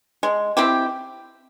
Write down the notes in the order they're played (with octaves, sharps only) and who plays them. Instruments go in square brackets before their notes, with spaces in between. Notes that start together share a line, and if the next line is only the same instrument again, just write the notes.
[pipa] G#3
C4 E4 G4